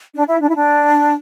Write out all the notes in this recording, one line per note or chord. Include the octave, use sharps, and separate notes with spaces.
D4
E4
D4
E4
D4